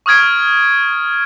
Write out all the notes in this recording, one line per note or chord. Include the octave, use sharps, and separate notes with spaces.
C#6 D#6 F6 G#6 D7